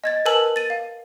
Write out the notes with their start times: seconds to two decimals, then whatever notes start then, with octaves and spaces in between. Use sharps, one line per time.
0.04 D#5 G#6 A6
0.25 A#4 B4 G#5 A5 E6 F#7
0.56 A6 D#7
0.70 F5